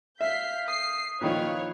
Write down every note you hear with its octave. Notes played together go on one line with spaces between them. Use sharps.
E5 F5 G6 B6 C7
D#6 C7
A#2 D#3 F3 B4 C#5 F5